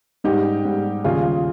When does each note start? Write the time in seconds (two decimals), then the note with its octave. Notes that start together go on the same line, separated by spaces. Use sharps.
0.24 G#2 G3 D#4 G4
0.65 G#2 G3
1.04 D#2 C#3 G3 F4 G#4